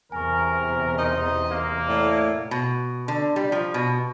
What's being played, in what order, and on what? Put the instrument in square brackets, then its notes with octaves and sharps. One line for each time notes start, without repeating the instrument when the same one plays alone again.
[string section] E2 C3 [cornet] A#4 [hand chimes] G#5 C#6
[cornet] D#4 [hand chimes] C5 A#5 C6 [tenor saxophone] D#5
[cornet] A#3
[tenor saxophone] A2 [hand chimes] D5
[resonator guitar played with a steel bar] B2
D3
G3
F3
B2